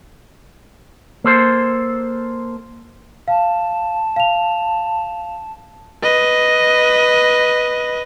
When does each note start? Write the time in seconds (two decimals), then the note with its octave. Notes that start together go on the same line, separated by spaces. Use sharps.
1.24 A#3 A4 C5
3.28 F5 A5
4.16 F5 F7
6.03 B4 D#5